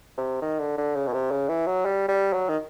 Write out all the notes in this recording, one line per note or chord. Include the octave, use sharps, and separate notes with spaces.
C3
D#3
D3
D3
C#3
B2
C3
C#3
E3
F#3
G3
G3
F#3
D#3